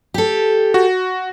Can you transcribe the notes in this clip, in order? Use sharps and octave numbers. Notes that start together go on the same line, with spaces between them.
G4 A4
F#4